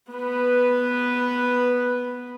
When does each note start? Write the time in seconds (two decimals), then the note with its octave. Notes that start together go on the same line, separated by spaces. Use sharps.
0.12 B3 B4